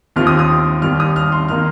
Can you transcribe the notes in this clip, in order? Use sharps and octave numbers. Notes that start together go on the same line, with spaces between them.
D#2 D#3 C4 F4 F6
D#6
D#6
D#2 D#3 G3 F6
D#6
F6
C6
D#3 A#3 D#4 F6